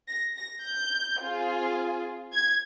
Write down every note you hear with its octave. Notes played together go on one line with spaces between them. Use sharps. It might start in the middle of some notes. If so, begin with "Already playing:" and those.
A#6
A#6
G6
C4 F4 G#4
G#6